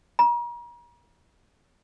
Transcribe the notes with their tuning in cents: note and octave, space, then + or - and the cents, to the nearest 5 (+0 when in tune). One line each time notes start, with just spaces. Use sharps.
A#5 +40